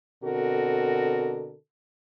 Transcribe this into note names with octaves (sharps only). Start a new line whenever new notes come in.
B2 D3 C4 F#4 A4 A#4